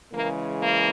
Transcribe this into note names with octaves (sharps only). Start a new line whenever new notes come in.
C#3 E3 G#3 A#3
A#3